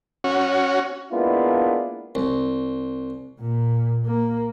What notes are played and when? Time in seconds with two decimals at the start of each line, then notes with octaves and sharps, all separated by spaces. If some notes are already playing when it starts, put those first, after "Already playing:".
0.24 C#4 F#4
1.12 G#3 A#3 B3 D4 E4 F4
2.15 C2
3.40 A#2
4.05 A#3